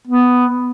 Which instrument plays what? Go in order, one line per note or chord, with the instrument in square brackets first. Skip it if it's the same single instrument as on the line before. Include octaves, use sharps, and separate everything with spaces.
[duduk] B3